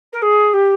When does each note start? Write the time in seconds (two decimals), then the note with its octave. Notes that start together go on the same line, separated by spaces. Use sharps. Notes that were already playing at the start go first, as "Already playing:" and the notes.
0.12 A#4
0.22 G#4
0.53 G4